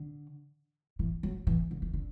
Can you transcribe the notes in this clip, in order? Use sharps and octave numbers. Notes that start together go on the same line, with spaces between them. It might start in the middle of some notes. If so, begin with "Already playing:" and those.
Already playing: D3
E3
F#3
E3
D3
E3
D3